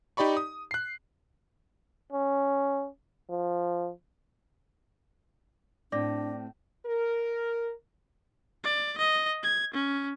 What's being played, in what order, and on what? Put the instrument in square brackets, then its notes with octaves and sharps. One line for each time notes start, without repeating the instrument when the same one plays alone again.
[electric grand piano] D#4 G4 D5 B5 C#6
D#6
F#6 C7
[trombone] C#4
F3
[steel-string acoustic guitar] A2 C4 [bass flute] D4 [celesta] D5 D6 A#6
[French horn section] A#4
[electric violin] D5
D#5
G#6
C#4